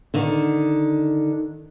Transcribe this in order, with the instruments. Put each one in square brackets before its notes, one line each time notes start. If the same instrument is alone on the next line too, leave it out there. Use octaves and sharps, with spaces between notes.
[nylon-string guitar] D3 D#3